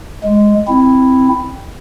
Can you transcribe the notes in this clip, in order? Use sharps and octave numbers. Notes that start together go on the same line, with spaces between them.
G#3
C4 E4